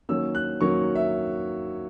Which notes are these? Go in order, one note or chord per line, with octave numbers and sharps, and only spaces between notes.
D#3 F#3 A#3 C#4 E6
F#6
D#3 F#3 A#3 C#4 C#6
E5